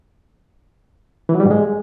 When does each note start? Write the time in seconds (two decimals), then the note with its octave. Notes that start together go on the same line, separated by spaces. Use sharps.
1.29 E3
1.35 F#3
1.40 G3
1.45 G#2
1.51 G#3